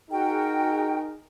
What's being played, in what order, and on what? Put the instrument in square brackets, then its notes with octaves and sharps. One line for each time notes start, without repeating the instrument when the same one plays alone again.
[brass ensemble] D#4 G#4 A#4 [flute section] F#4 G5